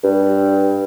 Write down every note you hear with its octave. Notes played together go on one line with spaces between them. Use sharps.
G2